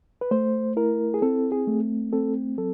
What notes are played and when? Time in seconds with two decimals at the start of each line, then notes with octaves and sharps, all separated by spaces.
0.21 B4
0.31 A3 C5
0.77 E4 A#4
1.14 G#4
1.22 C4 A4
1.52 G#4
1.67 A3
2.13 C4 A4
2.58 F#3 A4